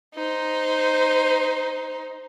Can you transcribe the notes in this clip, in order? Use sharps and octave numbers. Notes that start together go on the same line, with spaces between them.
D#4 C5